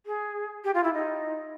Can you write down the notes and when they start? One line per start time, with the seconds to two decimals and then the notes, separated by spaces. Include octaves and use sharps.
0.06 G#4
0.64 G4
0.74 F4
0.84 E4
0.94 D#4